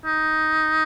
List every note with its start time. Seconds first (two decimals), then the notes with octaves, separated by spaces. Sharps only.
0.06 D#4